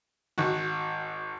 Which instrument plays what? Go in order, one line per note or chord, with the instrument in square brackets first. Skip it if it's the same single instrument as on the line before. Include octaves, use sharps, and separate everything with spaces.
[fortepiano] G#1 F#4